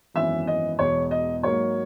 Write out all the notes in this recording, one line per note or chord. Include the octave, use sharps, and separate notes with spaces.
G#1 F#2 E3 B3 E5
D#5
E1 E2 B2 C#5
D#5
G#2 F#3 A#3 C#5